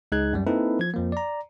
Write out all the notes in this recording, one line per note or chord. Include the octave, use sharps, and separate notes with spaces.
C#2 G#3 D#4 G#4 F#6 G#6
F#2 G3
A#3 C4 D#4 E4 A4 B4
F3 G#6
F2 F3 A#3
D5 A#5